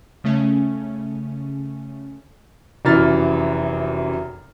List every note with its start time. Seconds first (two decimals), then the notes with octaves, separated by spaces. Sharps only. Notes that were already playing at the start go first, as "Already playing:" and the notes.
0.24 C#3 A3 C#4
2.85 F1 F#2 E3 F6 A6